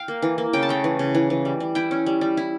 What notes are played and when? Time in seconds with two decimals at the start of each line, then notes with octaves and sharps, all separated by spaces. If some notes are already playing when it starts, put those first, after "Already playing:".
Already playing: F5 G5
0.08 A#3
0.22 E3
0.38 A#3
0.53 C#3 G5
0.63 A5
0.69 A3 G5
0.84 E3
0.99 C#3
1.15 E3
1.30 E3
1.45 G3
1.60 G3
1.75 E4 G5
1.91 C#4
2.06 G3
2.21 G3
2.37 E4